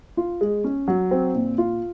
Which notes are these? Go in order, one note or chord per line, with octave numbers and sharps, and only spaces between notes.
F4
G#3
C#4
F#3
C4
A#2
F4